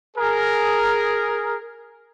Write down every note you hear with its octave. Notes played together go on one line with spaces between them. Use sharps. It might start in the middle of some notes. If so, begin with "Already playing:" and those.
G#4 A#4